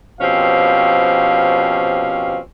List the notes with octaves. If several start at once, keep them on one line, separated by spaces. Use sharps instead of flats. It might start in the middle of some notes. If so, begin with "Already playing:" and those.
B2 F3 C4 C#4 G4 F5